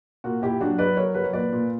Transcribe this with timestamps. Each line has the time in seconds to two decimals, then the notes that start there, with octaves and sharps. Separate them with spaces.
0.24 A#2 F#4 A#4
0.42 A#2 E4 G4
0.60 F#3 D4 F#4
0.78 F#3 B4 D5
0.97 F#3 A#4 C#5
1.14 F#3 B4
1.24 C#5
1.33 A#2 B4 D5
1.52 A#2